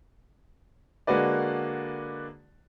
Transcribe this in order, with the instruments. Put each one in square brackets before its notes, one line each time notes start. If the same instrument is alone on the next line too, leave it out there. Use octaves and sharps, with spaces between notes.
[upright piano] D3 G#3 A#3 F#4 B4 D5